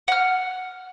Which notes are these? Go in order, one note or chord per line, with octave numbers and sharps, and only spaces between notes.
F#5 F6